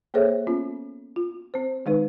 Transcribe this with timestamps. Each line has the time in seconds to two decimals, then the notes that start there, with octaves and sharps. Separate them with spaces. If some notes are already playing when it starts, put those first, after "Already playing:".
0.14 A#3 G#4 A4 C5 C#5 E5
0.47 B3 C#4 F4
1.16 F4
1.54 C4 C5
1.86 D#3 G#3 D#4 B4